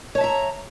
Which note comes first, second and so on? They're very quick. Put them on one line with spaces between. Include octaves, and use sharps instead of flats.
C#5 A5 E5 A#5